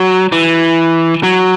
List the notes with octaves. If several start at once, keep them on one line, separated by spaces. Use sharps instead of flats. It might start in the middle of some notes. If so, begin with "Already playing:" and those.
Already playing: F#3
E3
F#3